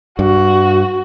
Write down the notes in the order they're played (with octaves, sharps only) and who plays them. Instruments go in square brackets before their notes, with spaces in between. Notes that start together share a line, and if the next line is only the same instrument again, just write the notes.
[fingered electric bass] G2 [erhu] F#4